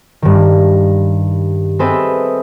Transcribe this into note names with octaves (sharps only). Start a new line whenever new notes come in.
G2 D#3
C4 G#4 A4 B4 D#5 E5